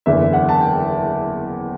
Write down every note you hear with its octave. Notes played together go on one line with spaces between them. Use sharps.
F#1 E2 D3 E5
F#5
A5
G5